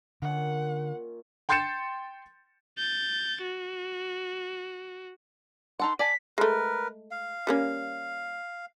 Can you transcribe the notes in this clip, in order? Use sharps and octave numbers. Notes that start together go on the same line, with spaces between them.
A#2 D3 D#3 C#4 F#5
G5 C6 G6 A6 C#7 E7
G6 A6
F#4
D#4 A4 F#5 C6
D5 G#5 A5 B6
G#3 A3 A#4 B4
F5
G3 A#3 C#4